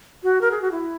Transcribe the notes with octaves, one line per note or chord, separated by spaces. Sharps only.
F#4
A#4
G#4
F#4
E4